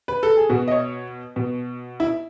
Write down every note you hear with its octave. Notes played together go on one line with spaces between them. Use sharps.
B4
A4
G#4
B2 F#4
D#5
C#5
B2
E4